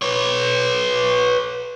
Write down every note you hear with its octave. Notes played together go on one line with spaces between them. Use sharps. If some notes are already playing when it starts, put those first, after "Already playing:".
B4 C#5